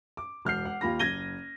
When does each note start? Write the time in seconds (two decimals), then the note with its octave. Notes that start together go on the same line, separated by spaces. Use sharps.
0.17 D6
0.45 E1 F6 G6 C7
0.65 F#5
0.81 D#2 F4 B5 A#6
0.99 F#1 G#6 A#6 D#7 G7